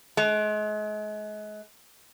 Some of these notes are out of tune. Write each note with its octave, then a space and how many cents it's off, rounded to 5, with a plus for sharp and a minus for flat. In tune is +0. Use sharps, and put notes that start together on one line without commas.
G#3 +35